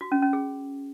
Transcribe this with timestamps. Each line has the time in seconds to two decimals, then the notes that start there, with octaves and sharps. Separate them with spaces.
0.01 F#4
0.12 C#4
0.22 C#4
0.33 G#4